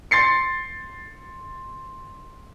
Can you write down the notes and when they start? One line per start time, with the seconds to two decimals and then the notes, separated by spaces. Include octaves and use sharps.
0.11 C6 A6 C7 C#7